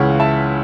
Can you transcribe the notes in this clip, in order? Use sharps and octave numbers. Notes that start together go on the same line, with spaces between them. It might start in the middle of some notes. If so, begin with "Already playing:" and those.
Already playing: C#2 C#3 E3 C#5 F#5
E5 A5